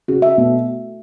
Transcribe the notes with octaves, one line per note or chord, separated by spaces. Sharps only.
C#3 F#4
E5
B2 A3